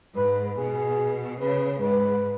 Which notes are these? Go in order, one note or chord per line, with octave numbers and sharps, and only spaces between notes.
G#2 B4
B2 G#4
C#3 B4
G#2 B4